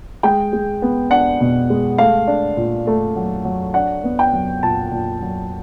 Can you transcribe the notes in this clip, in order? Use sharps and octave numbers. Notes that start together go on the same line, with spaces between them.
G#3 G5
G#3
B3
D4 F#5
B2
G#3
A3 F5
D4
A#2
A3
F#3
F#3
D4 F#5
B3
G5
F#3
A#2 A5
A#2
F#3